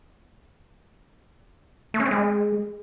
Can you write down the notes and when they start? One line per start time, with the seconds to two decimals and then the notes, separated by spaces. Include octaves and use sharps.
1.94 A3
2.00 C#4
2.05 C4
2.11 G#3